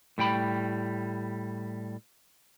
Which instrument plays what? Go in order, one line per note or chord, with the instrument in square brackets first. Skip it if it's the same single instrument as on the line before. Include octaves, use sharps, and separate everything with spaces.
[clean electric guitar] A2 G3 G5 B5